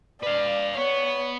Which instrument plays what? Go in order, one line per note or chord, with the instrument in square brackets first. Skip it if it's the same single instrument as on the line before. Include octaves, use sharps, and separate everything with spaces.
[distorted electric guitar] B4 F5 [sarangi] D5
[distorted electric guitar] B3 [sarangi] C#5